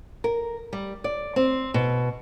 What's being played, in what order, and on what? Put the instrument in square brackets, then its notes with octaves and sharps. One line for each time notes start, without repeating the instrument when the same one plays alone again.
[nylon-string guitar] A#4
G3
D5
C4
B2